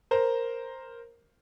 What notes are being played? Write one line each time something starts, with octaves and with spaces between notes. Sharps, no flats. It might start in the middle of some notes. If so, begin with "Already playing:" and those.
A#4 C5